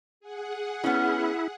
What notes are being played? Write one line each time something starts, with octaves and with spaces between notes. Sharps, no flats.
G#4 F#5
B3 C#4 E4